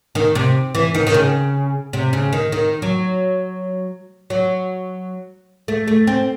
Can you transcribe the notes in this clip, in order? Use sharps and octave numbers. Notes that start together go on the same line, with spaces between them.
D#3
C3
E3
D#3
D#3
C#3
C3
C#3
D#3
D#3
F#3
F#3
A3
A3
C4